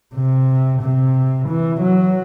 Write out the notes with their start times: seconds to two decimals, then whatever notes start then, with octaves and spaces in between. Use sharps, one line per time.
0.15 C3
0.82 C3
1.49 E3
1.81 F#3